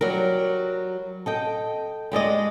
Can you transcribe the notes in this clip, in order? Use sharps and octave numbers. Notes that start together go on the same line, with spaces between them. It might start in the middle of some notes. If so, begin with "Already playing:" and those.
F#3 G3 A#4
A4 D#5 G5
G3 G#3 D5 D#5